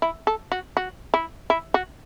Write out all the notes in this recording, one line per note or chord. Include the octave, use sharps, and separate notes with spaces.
E4
A4
F#4
F#4
E4
E4
F#4